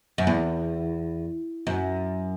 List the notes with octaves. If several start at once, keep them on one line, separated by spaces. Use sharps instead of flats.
F#2
E2
F#2